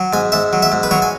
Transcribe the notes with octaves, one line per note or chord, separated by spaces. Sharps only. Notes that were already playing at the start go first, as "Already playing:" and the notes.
Already playing: F#3
G#2 G#5
G#2 E5
F#3
E5
G#2
B4
F#3 C#5
G#5